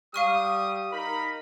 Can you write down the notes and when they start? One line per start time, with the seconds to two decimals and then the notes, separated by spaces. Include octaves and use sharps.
0.14 G3 G4 F5 C#6 D#6 F6
0.91 D#4 A#4 B5